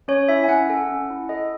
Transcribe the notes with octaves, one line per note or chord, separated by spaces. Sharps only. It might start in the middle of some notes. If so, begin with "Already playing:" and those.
C#4 C#5
E4 E5
G#5
C#4 F#5
A4
C#4
E4
A4 D#5